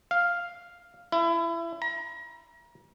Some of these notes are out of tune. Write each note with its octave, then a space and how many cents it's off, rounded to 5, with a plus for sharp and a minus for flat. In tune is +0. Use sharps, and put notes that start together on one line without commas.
F5 +0
E4 +25
A#5 +35